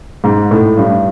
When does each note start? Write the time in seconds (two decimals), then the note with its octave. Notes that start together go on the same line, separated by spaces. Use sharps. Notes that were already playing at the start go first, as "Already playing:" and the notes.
0.24 G#2
0.51 A2
0.77 G2